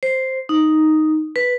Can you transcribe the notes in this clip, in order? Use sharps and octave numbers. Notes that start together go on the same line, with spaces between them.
C5
D#4
B4